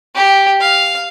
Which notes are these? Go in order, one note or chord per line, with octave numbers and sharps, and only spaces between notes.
G4
F5